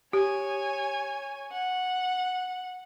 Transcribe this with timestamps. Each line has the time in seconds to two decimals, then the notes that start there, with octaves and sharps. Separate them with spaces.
0.13 G4 C#5 G#5
1.52 F#5